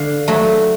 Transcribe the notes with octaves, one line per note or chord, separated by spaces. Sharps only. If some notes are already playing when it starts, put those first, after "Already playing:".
Already playing: D3 F5
F#3 A3 A4